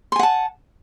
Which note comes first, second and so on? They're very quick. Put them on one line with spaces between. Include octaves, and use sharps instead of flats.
C6 G#5 F#5 A5